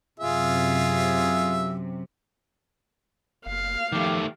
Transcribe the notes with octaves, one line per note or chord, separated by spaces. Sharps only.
F#2 C3 F4 G#4 E5
F#1 F5
D#3 F3 A3 G4 G5 D6